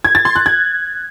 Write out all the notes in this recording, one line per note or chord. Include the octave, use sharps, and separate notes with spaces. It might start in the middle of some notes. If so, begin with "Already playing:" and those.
G#6
A6
C6
F#6
G#6